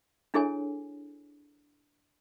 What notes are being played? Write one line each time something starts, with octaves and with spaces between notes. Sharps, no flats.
D4 E4 G#4 A4 C#5 G#5